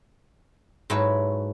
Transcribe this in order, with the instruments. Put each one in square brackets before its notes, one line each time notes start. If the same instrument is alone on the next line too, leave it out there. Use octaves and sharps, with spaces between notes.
[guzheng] G#2 F#3 E4 A4 B4 C#5